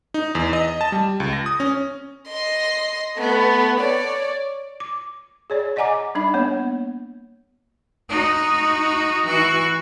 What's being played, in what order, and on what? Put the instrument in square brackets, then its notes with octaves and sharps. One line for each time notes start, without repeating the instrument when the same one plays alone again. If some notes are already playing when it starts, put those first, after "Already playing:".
[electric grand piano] D#4
E2
D#5
A5
G3
C#2
A#6
D#6
C#4
[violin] D#5 C6
A3 B3
C#5 D5
[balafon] D6
G#4 C#5 D5
D5 D#5 F#5 G#5 A#5 D6
G3 D4 D#4 E5 B5
A#3 B3 C#5
[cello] D#4 F#4
E3 F#4